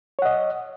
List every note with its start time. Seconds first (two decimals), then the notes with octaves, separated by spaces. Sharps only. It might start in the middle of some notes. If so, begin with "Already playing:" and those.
0.19 C#5
0.22 F#5
0.25 D#5